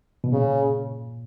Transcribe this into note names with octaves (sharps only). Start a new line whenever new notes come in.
B2
A#2 C#3